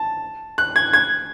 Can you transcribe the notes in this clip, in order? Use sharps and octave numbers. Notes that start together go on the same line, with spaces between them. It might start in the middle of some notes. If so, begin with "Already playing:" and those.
Already playing: A5
F#6
G#6
G#6